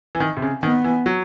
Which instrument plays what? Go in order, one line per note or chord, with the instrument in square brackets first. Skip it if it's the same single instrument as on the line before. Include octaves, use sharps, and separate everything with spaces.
[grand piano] E3
D#3
C3
C#3
[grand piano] D#3 [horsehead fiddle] B3
[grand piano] E3
F#3